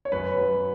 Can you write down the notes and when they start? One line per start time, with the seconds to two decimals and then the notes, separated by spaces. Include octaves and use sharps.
0.05 C#5
0.12 F#2 B4
0.37 F#3